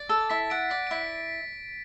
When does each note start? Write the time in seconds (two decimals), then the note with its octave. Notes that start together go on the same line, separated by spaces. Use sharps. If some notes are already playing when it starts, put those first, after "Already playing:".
Already playing: D5
0.09 A4 A6
0.30 E4 B6
0.50 F#5 D7
0.70 D5 B6
0.87 D7
0.91 E4 B6